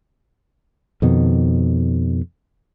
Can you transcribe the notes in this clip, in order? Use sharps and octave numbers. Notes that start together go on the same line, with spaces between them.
F2 B2 D#3